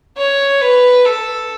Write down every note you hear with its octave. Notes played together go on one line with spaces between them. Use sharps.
C#5
B4
A4